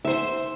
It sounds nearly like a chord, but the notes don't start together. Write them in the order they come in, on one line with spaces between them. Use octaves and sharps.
E5 C5 C6